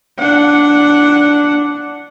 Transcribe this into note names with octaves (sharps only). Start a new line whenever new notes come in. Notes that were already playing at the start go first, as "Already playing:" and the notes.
D4 F#5